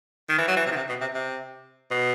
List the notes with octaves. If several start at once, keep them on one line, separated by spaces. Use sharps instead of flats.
D#3
E3
F#3
E3
C3
D#3
C3
B2
C3
C3
B2